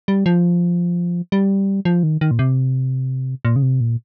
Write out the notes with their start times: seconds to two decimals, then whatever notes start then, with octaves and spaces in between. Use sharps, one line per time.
0.08 G3
0.26 F3
1.32 G3
1.85 F3
2.03 D#3
2.21 D#3
2.31 A#2
2.39 C3
3.45 A#2
3.56 C#3
3.62 C3
3.80 A#2